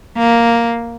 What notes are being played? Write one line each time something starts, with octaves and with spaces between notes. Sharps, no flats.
A#3